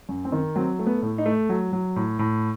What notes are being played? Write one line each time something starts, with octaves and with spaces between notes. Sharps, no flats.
F#2
C4
D#3
F#3 C4
A3
B3
A2
D#4
A3
F#3
F#3
A2
A2